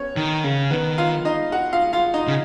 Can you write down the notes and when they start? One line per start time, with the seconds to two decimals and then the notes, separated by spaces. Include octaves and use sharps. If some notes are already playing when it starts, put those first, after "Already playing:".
Already playing: B3 C#4 C#5
0.16 D#3
0.44 C#3
0.71 D#3 B3 B4
0.98 F4 F5
1.25 D#4 D#5
1.52 F#4 F#5
1.73 F4 F5
1.93 F4 F5
2.14 D#4 D#5
2.27 C#3